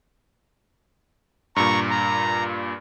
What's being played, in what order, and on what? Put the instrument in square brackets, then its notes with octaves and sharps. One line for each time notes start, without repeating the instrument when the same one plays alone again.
[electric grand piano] G2 A#2 [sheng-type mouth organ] A#5 C#6
[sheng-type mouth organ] A#5